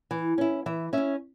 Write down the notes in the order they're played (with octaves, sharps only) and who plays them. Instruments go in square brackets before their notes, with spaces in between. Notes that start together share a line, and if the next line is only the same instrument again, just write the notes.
[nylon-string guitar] E3
C#4 E4
E3 E5
C#4 E4 E5